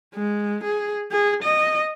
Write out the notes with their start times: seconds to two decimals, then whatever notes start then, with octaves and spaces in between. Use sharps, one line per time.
0.15 G#3
0.64 G#4
1.11 G#4
1.43 D#5